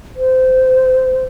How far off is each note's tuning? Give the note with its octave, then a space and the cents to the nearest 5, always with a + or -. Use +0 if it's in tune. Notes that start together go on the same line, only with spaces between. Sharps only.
C5 -20